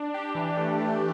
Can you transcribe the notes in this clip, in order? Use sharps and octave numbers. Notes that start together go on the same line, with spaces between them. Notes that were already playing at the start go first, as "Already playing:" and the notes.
Already playing: D4
G4
E3
A3
A3